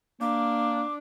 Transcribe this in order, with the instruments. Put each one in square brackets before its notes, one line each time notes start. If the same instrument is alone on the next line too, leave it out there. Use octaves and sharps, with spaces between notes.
[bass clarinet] A#3 [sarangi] D4 [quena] D6